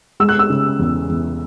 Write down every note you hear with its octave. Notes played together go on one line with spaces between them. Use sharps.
G#3 E6
F#6
E6
C#3
E2
E2